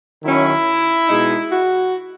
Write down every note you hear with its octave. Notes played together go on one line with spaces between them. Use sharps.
D#3 F#3 C#4 E4
B2 G#3 D#4
F#4